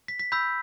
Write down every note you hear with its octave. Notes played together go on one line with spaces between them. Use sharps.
B6
B6
B5 E6 G6 B6